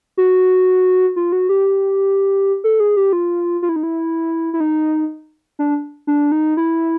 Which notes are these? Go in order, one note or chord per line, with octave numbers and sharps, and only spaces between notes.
F#4
F4
F#4
G4
A4
G#4
G4
F4
F4
E4
D#4
E4
E4
D#4
D4
D4
D#4
E4